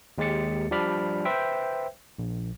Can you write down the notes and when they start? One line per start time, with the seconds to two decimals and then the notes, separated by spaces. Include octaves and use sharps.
0.18 D#2 G#3 G4 A6 C#7
0.71 F3 G3 D4 D5 B5 F6
1.25 B4 C5 E5 G5
2.19 A#1